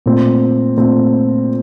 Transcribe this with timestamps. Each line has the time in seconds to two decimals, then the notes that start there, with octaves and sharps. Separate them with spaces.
0.06 A#2 A3 C4
0.77 A#2 A3 C4